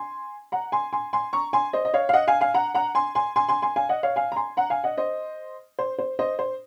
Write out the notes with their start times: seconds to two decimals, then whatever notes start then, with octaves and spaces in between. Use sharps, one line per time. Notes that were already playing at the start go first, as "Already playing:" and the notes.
Already playing: G#5 C6
0.52 F#5 A#5
0.72 G#5 C6
0.93 G#5 C6
1.13 G#5 C6
1.33 A#5 C#6
1.53 G#5 C6
1.73 C5 D#5
1.85 D#5
1.94 C#5 F5
2.09 F5
2.13 D#5 F#5
2.28 F5 G#5
2.41 F5 G#5
2.54 F#5 A#5
2.75 F#5 A#5
2.95 G#5 C6
3.15 G#5 C6
3.36 G#5 C6
3.49 G#5 C6
3.62 G#5 C6
3.76 F5 G#5
3.89 D#5 F#5
4.03 C#5 F5
4.16 F5 G#5
4.32 A#5
4.36 G#5 C6
4.57 F#5 A#5
4.70 F5 G#5
4.84 D#5 F#5
4.97 C5 D#5
5.79 C5
5.99 C5
6.19 C5 D#5
6.39 C5